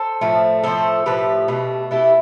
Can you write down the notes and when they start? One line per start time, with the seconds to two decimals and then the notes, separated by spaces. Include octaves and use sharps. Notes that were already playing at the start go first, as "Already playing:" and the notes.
Already playing: A4 C5
0.21 A2 F3 A3
0.63 A2 F3 A3 A4 C5
1.06 A2 F3 A3 G4 B4
1.48 B2 A3
1.91 B2 A3 E4 G4